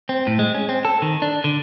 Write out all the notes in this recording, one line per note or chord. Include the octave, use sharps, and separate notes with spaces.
C4
A2
G#3
C#4
C4
A4
D#3
D4
D3